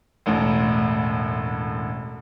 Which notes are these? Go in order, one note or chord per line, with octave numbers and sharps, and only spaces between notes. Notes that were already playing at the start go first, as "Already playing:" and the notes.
E1 A1 A2